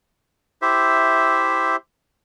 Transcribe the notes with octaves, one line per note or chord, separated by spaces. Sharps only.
E4 G4 C5 E5